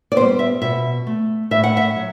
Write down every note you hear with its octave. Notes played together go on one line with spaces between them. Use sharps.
D5
G3 B3 C5
E5
B2 E5
A3
A2 E5
F#5
E5
F#3